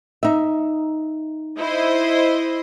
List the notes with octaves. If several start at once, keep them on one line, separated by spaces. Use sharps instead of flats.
D#4 E5
E4 C5 D#5